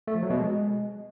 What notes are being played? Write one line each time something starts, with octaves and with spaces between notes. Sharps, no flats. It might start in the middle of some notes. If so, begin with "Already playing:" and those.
A3
F3
F#3
B2
G#3